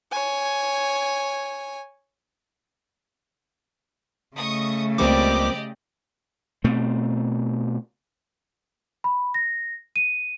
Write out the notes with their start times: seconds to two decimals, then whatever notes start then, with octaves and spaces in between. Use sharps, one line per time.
0.11 C#5 G#5
4.36 C#3 A3 D#5 C#6 D#6
4.98 C#2 G3 A#3 C4 G4 D5 D#5 D6
6.64 B2 A3 C4
9.04 B5
9.34 A#6
9.96 D#7